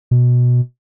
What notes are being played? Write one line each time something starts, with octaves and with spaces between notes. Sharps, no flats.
B2